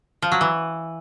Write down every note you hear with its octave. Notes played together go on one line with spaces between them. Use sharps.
F3
F#3
E3